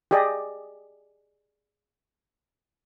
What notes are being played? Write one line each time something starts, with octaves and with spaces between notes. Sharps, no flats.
G4 G#4 D5 D#5